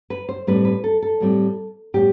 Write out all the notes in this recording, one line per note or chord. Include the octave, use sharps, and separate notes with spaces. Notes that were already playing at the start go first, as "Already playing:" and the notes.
B4
C5
A2 G3 C4 B4
B4
A4
A4
A2 G3 C4
A2 G3 B3 G4